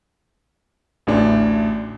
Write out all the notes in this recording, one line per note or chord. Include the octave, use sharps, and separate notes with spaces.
A1 D2 D4